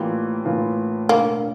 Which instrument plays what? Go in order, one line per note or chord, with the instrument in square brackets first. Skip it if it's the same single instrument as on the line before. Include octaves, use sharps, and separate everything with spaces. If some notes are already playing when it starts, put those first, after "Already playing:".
Already playing: [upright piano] A2 E3 A#3 F4 [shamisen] G3
[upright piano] A2 E3 A#3 F4
[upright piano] E1 D2 D3 [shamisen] A#3